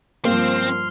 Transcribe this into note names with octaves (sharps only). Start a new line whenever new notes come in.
G2 F3 A#3 C4 C6 F6